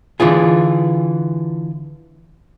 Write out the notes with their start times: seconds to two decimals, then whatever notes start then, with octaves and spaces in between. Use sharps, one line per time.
0.20 D3 E3 F4 G#4